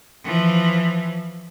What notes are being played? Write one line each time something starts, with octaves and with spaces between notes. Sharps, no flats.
E3 F3